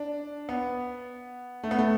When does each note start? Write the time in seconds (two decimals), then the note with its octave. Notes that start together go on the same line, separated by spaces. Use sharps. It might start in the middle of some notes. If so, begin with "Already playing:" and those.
Already playing: D4
0.49 B3
1.63 A3
1.71 B3
1.78 A3